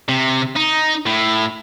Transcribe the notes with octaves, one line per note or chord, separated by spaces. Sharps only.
C3
D#4
A2